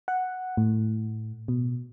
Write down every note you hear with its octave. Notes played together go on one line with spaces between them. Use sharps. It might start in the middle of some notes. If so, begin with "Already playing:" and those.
F#5
A2
B2